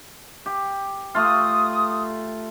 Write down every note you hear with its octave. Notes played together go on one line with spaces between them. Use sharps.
G4
A3 F4 D#6